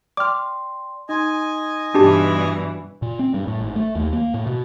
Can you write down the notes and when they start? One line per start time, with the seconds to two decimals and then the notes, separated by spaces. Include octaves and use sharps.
0.17 D5 G5 C6 D6 F6
1.09 D#4 D#5 G#5 C6 G#6
1.95 G2 B2 E3 D4 G4 A5
3.02 A#2
3.19 C4
3.34 G2
3.47 A2
3.61 G#1
3.76 A3
3.95 D#2
4.13 A#3
4.34 A2
4.47 B2